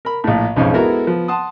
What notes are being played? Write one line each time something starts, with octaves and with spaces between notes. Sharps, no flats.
A#4 B5
A#1 A2
B1 F2 G#2 C#4 D#4 F5
G#3 B3 E4 F#4 A4 A#4
F3 B3
F#5 A5 C6 D#6